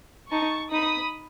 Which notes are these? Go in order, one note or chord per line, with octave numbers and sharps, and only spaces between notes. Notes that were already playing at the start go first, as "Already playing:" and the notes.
D#4 A5 C#6
D#4 B5 D#6